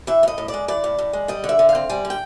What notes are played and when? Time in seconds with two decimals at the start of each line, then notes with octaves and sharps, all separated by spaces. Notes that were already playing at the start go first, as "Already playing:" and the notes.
0.07 E3 E5
0.23 A2 D#5
0.38 A2
0.48 D5
0.54 G#3
0.68 E3 D5
0.84 A2
0.98 A2
1.13 G#3
1.28 G3 D#5
1.44 D3
1.49 E5
1.59 D3
1.69 F5
1.75 C4
1.89 G3 G#5
2.05 D3
2.10 G5